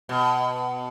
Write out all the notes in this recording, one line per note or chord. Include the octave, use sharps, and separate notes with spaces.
B2